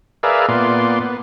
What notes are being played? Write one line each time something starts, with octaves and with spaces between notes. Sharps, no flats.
G#4 A#4 B4 D5 E5 F5
A#2 B3 D5 C6
B3